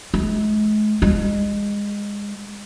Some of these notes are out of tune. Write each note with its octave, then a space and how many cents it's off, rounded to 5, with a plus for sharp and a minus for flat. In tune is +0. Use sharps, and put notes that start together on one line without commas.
G#3 +40
G#3 -25